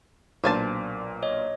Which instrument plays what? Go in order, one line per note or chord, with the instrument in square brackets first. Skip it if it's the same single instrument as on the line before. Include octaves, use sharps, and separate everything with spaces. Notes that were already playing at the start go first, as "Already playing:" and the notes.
[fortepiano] B1 A#2 D4 [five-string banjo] C5 G#5 A5
[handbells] C#5 D#5